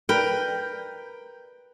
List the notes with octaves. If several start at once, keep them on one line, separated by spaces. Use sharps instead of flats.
A#4 B4 G5